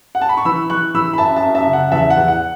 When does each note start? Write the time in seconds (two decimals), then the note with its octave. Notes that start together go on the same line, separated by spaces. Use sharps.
0.15 F#5
0.21 A5
0.29 B5
0.37 C#6
0.45 E3 B5 E6
0.70 E3 C#6 F#6
0.94 E3 B5 E6
1.13 B5
1.18 F#2 E5 A5
1.36 E5 A5
1.43 F#2
1.55 E5 A5
1.67 C#3
1.73 F#5
1.91 E2 E5 A5
2.10 F#5
2.17 E2
2.28 F#5